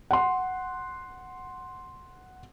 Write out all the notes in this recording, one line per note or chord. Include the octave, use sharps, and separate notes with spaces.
F#5 C6